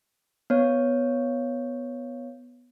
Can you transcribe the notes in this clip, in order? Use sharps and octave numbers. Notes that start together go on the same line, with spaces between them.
B3 C#5